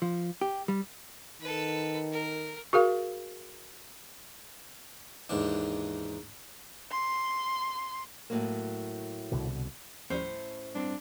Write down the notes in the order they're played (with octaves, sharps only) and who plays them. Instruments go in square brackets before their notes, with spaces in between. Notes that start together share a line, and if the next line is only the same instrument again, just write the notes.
[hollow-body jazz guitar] F3
G4
G3
[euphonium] D#3 [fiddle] A4 B4
[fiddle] A#4
[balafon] F#4 G#4 A#4 F5
[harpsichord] D#2 G#2 E3 D4
[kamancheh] C6
[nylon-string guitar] A2 F#3 A#3
[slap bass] C2 B2 D3
[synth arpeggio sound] D#2 F3 G3 [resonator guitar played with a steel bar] A2 C#4 C5
[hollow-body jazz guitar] G2 C4 [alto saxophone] D4